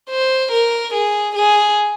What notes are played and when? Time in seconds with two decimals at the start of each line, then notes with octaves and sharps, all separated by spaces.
0.10 C5
0.52 A#4
0.94 G#4
1.35 G#4